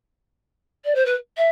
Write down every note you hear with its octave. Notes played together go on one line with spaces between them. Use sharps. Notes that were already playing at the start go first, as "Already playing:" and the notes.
D5
C5
B4
E5